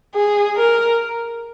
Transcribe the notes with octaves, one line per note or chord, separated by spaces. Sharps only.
G#4
A#4